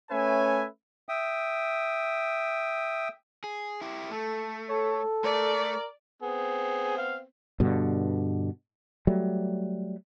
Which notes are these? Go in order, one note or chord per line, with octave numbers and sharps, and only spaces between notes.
A3 C#4 B4 C#5 E5 G#5
E5 G5 D#6
G#4
E4 G4
A3 A4
A4 C#5
A3 A#4 D5
B3 C4 G#4
F5
G2 B2 D3
F#3 G3 A3